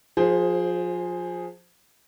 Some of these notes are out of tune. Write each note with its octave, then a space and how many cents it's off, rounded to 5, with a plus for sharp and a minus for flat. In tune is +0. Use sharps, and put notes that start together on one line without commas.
F3 +30 G#4 +0 C5 +0